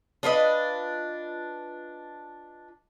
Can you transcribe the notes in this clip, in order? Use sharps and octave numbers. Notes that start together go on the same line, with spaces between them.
D4 F4 B4 D#5